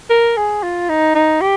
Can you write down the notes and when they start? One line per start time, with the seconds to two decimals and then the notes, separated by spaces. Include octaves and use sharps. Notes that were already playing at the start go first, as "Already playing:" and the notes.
0.10 A#4
0.37 G#4
0.63 F4
0.89 D#4
1.15 D#4
1.41 G4